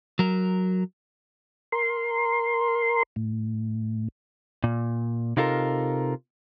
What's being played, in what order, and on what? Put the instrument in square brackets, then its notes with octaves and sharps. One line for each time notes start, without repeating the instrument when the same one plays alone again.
[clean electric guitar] F#3 A#4
[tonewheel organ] A#4 C6
A2
[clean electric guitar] A#2
C3 D#4 F4 A4 A#4